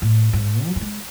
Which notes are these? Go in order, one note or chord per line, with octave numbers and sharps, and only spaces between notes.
A2
G#2
F#3
F#3
G#3